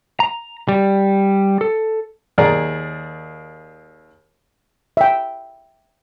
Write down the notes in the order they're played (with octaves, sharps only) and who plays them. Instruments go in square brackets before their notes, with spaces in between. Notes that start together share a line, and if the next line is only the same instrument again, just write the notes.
[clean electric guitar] A#5
G3
A4
[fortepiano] D#2 G#4 D5 A#5
[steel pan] E5 G5